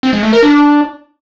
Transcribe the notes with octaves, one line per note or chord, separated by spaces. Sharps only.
C4
G#3
A3
A#4
D4